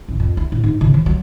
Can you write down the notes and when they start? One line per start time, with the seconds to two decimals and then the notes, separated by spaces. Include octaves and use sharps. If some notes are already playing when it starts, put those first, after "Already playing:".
0.08 A1
0.20 F2
0.37 E4
0.52 A2
0.64 G#2
0.81 C#3
0.94 E3
1.06 F#3